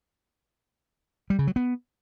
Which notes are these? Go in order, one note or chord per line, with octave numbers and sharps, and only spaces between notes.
G3
C#3
F#3
B3